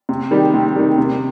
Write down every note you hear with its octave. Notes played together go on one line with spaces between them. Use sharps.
C3
D#3 G3
C3
D#3 G3
C3